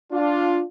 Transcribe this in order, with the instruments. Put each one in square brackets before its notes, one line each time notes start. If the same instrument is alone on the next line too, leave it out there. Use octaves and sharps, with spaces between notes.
[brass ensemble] D4 F4